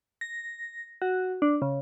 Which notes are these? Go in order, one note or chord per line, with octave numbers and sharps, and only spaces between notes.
A#6
F#4
D4
C#3